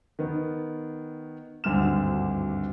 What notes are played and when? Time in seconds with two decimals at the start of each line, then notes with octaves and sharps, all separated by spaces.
0.19 D#3 B3
1.64 G#1 D2 G2 D3 F6 E7